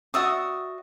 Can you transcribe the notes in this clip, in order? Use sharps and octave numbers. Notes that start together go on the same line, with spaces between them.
F#4 D5 E5 D#6